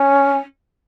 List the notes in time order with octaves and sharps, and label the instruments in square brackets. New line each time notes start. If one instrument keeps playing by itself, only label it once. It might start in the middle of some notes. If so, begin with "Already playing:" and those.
Already playing: [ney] C#4